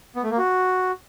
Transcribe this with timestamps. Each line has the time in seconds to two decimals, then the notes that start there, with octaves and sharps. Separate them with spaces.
0.16 B3
0.23 A3
0.31 A#3
0.38 F#4